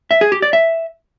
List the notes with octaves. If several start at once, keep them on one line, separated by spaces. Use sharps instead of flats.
E5
G#4
G4
D5
E5